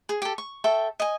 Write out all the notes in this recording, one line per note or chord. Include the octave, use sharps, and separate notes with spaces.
G#4
G4 A4
C#6
A4 E5 G5 C#6
D#5 G#5